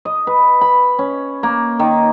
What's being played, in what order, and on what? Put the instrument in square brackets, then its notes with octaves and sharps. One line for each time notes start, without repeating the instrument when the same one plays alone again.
[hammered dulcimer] D#5
B4
B5
C#4
A#3
D#3